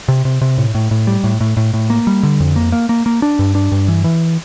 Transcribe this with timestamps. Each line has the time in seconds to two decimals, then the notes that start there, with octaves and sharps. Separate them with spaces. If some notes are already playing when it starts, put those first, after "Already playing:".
0.08 C3
0.25 C3
0.41 C3
0.58 A2
0.75 A2
0.91 A2
1.07 G3
1.24 A2
1.41 A2
1.57 A2
1.74 A2
1.90 A#3
2.07 G3
2.23 D3
2.40 F2
2.56 A#3
2.72 A#3
2.89 A#3
3.06 A#3
3.22 D4
3.39 G2
3.55 D4
3.72 G2
3.88 E3
4.04 E3